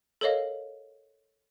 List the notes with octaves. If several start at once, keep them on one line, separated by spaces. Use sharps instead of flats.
A4 A#4 C#5 D#5 F5